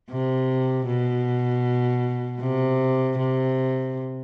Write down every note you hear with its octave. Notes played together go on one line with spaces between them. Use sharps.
C3
B2
C3
C3